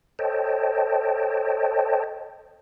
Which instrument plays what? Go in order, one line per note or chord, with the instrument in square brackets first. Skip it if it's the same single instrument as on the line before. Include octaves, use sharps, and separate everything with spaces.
[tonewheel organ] A4 C5 C#5 D#5 G5 A5